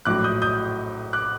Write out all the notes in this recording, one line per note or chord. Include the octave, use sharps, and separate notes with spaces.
A#1 A2 F#3 D6 F#6
D#6 G6
D#6 G6
D6 F#6